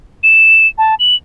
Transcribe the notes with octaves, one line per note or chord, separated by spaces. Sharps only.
E7
A5
F#7